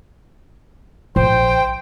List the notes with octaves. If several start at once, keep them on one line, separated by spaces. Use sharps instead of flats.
A#1 C5 G5